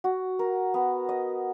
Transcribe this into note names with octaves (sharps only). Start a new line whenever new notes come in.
F#4
A#4
B3
D#5